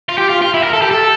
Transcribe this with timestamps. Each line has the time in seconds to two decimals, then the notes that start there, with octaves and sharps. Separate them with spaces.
0.09 F4
0.18 G4
0.29 F4
0.42 F4
0.54 E4
0.63 A#4
0.73 A4
0.82 G4
0.91 A4